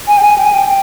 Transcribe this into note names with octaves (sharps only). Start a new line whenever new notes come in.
G#5
G5
G#5
G5
G#5
G5